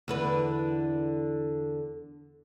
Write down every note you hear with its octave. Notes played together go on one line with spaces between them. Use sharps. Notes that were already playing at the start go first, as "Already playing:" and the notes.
E2 D3 B4